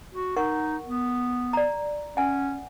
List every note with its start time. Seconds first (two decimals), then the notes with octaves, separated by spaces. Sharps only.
0.14 F#4
0.36 D#4 A#4 F#5 C#6
0.86 B3
1.53 D5 A#5
2.17 C#4 F#5 G#5